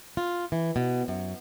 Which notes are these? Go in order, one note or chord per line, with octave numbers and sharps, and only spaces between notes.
F4
E3
B2
F#2